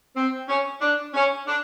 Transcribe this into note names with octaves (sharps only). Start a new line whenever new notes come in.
C4
C#4
D4
C#4
D4